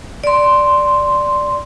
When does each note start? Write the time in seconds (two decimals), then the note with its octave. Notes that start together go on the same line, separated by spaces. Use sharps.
0.24 D5 C6